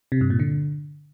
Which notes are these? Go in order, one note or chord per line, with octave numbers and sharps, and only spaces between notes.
C3
G2
A#2
D3